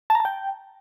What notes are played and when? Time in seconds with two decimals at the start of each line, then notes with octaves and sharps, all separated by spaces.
0.10 A5
0.15 A#5
0.20 A5
0.25 G5